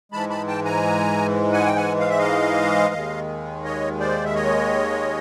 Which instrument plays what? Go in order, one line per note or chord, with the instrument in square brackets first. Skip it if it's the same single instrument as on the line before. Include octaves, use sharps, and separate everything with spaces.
[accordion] G#2 E3 G#3 A5 B5
A5 B5
G5 A5
G#5 A#5
F#5 G#5
G5
F#5 G#5
F5
E5
D#5 F5
D#2 D#3 G#3
C#5 D#5
C5 D5
E5
C#5 D#5